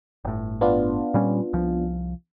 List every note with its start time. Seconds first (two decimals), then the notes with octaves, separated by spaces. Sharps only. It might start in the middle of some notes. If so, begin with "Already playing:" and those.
0.25 G1 A2
0.61 B3 D4 F4
1.14 A#2 G3 C#4
1.53 C2 F3